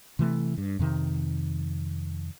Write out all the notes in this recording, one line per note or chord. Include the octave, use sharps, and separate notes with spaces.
C3 E3 A3
G2
F2 C3 D#3